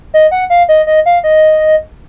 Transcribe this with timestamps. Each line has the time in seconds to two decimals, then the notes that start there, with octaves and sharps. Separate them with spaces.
0.14 D#5
0.31 F#5
0.50 F5
0.69 D#5
0.87 D#5
1.06 F5
1.24 D#5